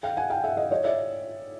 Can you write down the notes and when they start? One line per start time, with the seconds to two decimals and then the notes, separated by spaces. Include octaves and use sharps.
0.03 F5 G5
0.17 F#5 G#5
0.30 F5 G5
0.44 E5 F#5
0.57 D#5 F5
0.71 C#5 D#5
0.84 D5 E5